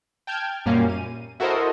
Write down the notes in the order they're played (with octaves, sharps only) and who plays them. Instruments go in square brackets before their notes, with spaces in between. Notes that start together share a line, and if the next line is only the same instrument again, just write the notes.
[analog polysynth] G5 A5 F6 G6 G#6
F#2 A#2 G3 A#3 C#4 F5
D#7
E4 F#4 A4 A#4 C5 D#5